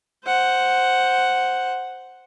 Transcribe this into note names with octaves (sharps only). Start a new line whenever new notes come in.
C5 F#5